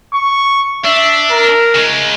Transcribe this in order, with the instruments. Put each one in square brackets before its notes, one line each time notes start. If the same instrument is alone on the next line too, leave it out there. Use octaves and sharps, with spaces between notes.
[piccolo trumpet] C#6
[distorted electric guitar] D4 [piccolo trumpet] E5
[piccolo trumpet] A#4
[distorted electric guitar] C#3 G#3